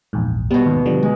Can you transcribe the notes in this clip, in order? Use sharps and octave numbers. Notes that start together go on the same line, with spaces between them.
A#1 E2 G#2
B2 G3 B3
D#2 G#2
D3 F3 G3
G#3